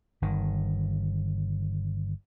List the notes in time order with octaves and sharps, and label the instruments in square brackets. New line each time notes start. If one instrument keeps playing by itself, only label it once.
[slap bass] G1 D#3